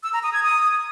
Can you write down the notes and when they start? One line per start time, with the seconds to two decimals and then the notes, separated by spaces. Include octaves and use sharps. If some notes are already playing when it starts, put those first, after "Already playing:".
0.03 E6
0.13 A#5
0.23 D#6
0.33 G#6
0.43 D#6